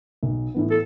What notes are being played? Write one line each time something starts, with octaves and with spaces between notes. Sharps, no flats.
B1
A2 E3 B3
A4